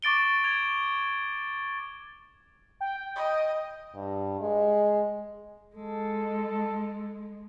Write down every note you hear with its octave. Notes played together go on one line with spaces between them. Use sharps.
C#6 D6 A6 D7 G7
G#6 F7
G5
D#5
G2
G#3
G#3 A4